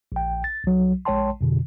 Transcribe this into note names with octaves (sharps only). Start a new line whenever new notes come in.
A#1 G5
A6
C2 F#3
A#1 G#3 C#5 G5 A5 C6
F2 B2 D3